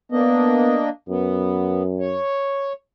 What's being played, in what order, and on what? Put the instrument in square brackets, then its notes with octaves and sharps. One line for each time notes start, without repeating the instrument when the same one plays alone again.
[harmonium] A#3 D4 D#5 [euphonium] B3
[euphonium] F#2 [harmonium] B3
[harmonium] C#5